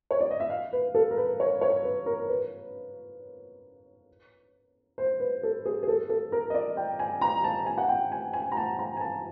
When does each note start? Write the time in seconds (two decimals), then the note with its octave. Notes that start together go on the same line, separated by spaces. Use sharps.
0.11 C#5
0.21 D5
0.31 D#5
0.40 E5
0.50 F5
0.73 B4
0.95 A4
1.11 A#4
1.17 B4
1.40 C#5
1.61 C#5
1.84 B4
2.06 A#4
2.29 B4
4.98 C5
5.20 B4
5.43 A4
5.65 G#4
5.83 G#4
5.88 A4
6.09 A4
6.32 A#4
6.50 D#5
6.54 D5
6.77 G5
6.99 G#5
7.21 A#5
7.44 A5
7.66 G#5
7.78 F#5
7.89 G5
8.12 G#5
8.33 G#5
8.51 A#5
8.57 A5
8.79 A#5
8.97 G#5
9.01 A5